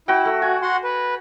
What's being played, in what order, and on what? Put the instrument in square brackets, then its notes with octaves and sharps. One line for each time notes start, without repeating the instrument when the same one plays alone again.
[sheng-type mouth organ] E4 [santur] F#4 G5
[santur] A3
[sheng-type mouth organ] F#4 [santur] G#5
[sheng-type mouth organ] F#4 F#5 C6
B4